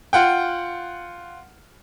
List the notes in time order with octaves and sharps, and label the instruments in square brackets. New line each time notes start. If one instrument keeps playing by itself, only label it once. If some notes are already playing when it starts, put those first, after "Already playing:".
[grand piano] F4 F#5 G5